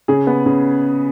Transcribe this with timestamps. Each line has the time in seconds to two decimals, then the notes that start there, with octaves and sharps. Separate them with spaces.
0.08 C#3 G#4
0.27 B3
0.46 C#3